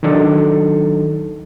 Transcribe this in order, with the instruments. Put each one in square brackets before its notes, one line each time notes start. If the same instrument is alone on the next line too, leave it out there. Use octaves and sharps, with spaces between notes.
[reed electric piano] D#3 F#3 D4 D#4 A4